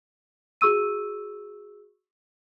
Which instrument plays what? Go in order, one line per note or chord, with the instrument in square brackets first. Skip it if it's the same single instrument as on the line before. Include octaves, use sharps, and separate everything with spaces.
[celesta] F#4 G#4 C#6 E6 D#7